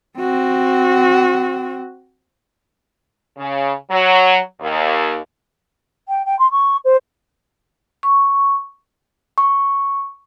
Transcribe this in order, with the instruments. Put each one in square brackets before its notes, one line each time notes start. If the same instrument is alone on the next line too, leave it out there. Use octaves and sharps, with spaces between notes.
[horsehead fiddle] C4 F#4
[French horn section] C#3
F#3
D#2
[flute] G5
G5
C6
C#6
C5
[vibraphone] C#6
[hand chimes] C#6